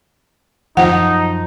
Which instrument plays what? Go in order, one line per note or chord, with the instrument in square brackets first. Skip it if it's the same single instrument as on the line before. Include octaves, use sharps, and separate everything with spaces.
[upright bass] F#2 [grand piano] F3 [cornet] D#4 [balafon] F#5